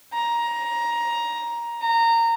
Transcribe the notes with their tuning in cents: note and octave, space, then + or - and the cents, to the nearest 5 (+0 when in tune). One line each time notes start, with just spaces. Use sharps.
A#5 +15
A#5 -20